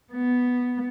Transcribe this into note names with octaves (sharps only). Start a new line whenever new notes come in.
B3